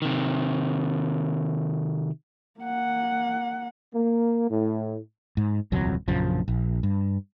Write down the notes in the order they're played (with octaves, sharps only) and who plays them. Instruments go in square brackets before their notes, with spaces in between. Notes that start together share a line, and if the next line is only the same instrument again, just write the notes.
[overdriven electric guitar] C3 D#3
[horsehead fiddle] A#3 F#5
[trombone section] A#3
A2
[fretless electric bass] G#2
D#1 C2 F2 F#3
A#1 F#2 C#3 F3
A#1
G2